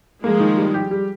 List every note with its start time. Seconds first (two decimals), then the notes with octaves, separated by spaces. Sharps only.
0.23 F3 G#3 A#3
0.40 D#3
0.57 G3
0.74 G4
0.91 G3